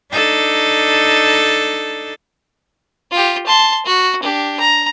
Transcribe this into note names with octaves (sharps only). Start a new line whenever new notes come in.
D4 D#4 A4
F4 G4
A5 C6
F#4
D4 G4
A#5